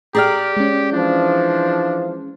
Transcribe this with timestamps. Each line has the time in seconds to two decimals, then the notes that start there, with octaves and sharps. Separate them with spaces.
0.15 G4 G#4 D5 G5 A#5 F6
0.57 G#3 C#4
0.92 E3 F3 D4